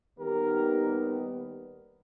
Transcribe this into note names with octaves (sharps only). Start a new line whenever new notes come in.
D#2 D#3 G3 B3 G4 A#4